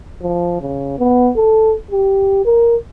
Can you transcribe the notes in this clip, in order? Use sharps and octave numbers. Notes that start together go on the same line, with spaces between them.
F3
C#3
B3
A4
G4
A#4